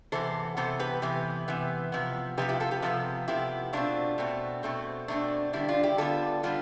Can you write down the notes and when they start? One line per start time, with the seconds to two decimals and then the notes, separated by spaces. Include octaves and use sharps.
0.12 C3 E3 B3 A4 C5
0.57 C3 E3 B3 A4 C5
0.79 G4 B4
1.02 C3 E3 B3 G4 B4
1.48 C3 E3 B3
1.92 C3 F3 B3
2.37 C3 F3 B3 G4 B4
2.49 E4 G4
2.60 F4 A4
2.71 G4 B4
2.82 C3 F3 B3 F4 A4
3.28 C3 F3 B3 E4 G4
3.73 B2 A3 C4 D4 F4
4.18 B2 A3 C4
4.63 B2 A3 C4
5.08 B2 A3 C4 D4
5.53 D3 G3 B3 E4
5.68 D4 F4
5.83 E4 G4
5.98 D3 G3 B3 F4 A4
6.43 D3 G3 B3 D4 F4